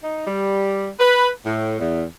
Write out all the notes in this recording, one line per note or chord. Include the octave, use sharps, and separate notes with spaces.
D#4
G3
B4
A2
E2